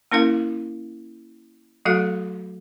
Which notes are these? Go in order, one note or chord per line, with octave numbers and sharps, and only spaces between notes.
A#3 C#4 E4 A#4 F5
F#3 A3 F#4 A4 F5